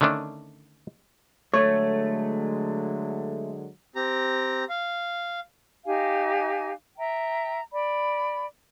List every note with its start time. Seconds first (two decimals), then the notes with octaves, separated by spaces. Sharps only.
0.01 D3 D#3 A3 C#4 D4
1.54 D3 F#3 G#3 A3 C#5
3.96 C4 G4 A#5
4.69 F5
5.85 D#4 G4 F5 G#5
6.97 E5 G5 A#5
7.72 D5 B5